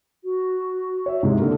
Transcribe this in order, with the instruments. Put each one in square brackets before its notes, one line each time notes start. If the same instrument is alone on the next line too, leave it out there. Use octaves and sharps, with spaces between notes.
[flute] F#4
[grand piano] C#5 E5
G#2 C3 G#3
[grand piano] D3 A#3 [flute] A4